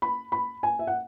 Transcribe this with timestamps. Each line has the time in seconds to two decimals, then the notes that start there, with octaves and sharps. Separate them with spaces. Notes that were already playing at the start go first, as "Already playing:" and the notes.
0.02 B5
0.32 B5
0.63 G#5
0.79 E5
0.87 F#5